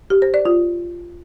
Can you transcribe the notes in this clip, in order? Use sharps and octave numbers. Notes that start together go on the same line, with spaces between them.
G4
C5
D5
F4